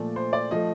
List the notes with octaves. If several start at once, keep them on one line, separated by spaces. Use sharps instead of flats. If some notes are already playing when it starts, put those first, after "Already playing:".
Already playing: A#2 F3 A3 D5
C5
D5
F3 A3 D#5